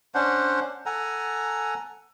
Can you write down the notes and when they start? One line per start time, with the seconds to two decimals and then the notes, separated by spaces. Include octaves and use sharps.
0.15 C#4 D4 C5 F#5
0.86 A4 F#5 G#5 A#5